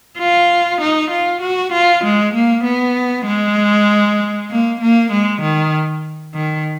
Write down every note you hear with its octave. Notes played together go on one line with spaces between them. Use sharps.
F4
D#4
F4
F#4
F4
G#3
A#3
B3
G#3
A#3
A#3
G#3
D#3
D#3